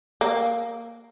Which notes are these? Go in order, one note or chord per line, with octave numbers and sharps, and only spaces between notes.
A#3